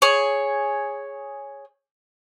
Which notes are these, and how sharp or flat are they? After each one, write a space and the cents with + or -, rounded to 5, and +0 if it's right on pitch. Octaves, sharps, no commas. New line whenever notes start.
G#4 +0 C#5 +0